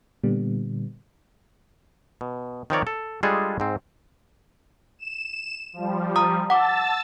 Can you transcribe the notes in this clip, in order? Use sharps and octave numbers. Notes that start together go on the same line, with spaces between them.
A#2 D3 G3 B3
B2
D#3 F3 C4 A#4 C#5 D5
A4
G3 G#3 D4 F4 G#4 A4
G#2 C4
E7
F3 G3
A#5 D#6
F#5 A5 D6 E6 A6